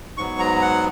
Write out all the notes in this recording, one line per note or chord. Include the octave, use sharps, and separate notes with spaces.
G#2 F#3 B3 C#6
A#5
F#5